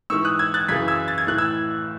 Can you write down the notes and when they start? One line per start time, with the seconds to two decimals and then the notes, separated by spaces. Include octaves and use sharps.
0.10 G#2 E3 C#6 E6
0.25 D#6 F#6
0.39 E6 G#6
0.54 F#6 A6
0.68 F#2 C#3 E3 G#6 B6
0.88 E6 G#6
1.08 A6
1.18 G#6
1.27 A2 E3 F#6
1.38 E6 G#6